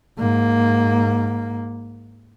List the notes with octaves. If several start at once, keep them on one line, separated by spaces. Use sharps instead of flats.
G#2 A#3